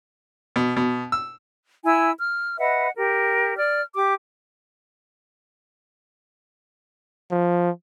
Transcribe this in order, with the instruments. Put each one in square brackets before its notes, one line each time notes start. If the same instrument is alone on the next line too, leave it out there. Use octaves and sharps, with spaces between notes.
[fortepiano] B2
B2
E6
[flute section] E4 E5 G#5 E6
F6
B4 D#5 E5 F#5
G4 A#4
D5 F6
G4 D6
[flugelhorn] F3